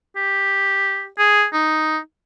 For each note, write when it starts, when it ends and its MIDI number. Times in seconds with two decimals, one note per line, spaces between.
0.16 1.07 67
1.18 1.45 68
1.53 1.98 63